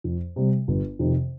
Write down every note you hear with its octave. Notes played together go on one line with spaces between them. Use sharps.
F2
C3 G3
G1
F2 C3 D#3